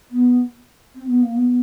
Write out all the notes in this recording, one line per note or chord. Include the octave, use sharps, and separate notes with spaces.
B3
C4
B3
A#3
B3